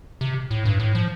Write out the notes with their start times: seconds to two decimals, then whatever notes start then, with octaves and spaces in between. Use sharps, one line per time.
0.21 C3
0.51 A2
0.65 G2
0.79 A2
0.95 F3